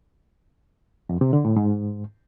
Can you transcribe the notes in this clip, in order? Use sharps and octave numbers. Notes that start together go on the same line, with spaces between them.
F2
C3
D3
A2
G#2